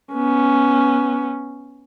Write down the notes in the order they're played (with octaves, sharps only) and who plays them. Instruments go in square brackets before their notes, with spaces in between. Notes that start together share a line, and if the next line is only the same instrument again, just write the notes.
[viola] B3 C#4